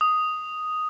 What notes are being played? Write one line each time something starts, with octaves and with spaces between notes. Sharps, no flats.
D#6